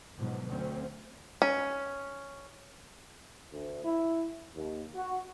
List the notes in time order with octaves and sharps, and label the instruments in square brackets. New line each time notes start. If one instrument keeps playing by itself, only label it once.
[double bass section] G#2 B2 D3 F3 F#3
D2 F#3 C4 C#4
[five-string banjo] C#4
[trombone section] D2
E4
D#2
F#4